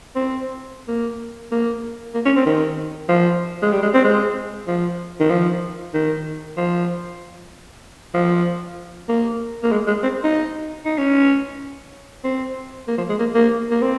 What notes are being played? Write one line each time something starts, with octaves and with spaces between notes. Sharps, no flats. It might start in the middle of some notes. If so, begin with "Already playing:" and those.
C4
A#3
A#3
A#3
C#4
C4
D#3
F3
G#3
G3
G#3
C4
G#3
F3
D#3
F3
D#3
F3
F3
A#3
A#3
G#3
G#3
C4
D#4
D#4
C#4
C4
A#3
F3
G#3
A#3
A#3
A#3
C4